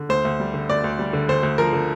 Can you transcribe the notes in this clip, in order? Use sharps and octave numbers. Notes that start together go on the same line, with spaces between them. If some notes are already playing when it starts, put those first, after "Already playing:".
Already playing: D3
D2 C5
D2
G3
D3
D2 D5
D2
G3
D3
D2 C5
D2
F3 A#4
D3